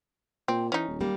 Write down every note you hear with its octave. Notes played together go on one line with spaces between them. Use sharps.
A#2 C4
E3 C#4 D#4
D#1
G3 A#3